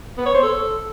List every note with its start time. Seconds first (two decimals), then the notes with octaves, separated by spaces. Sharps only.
0.18 B3
0.26 C#5
0.34 C5
0.43 A4